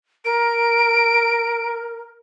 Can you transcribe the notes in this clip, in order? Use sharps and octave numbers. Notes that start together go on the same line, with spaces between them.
A#4 D7